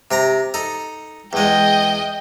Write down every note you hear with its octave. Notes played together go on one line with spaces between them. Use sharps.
C3 G5 A#5
D#4 A4
E2 G#3 D#5 G5